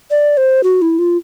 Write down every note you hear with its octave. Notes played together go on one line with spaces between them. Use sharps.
D5
C5
F#4
E4
F4